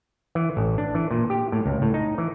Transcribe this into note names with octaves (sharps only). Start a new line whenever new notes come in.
E3
A1
D4
E3
A#2
G4
A2
C#2
A2
D#4
E3